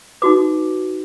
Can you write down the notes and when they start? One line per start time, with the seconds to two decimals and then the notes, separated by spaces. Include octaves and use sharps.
0.22 D#4 F#4 B4 D6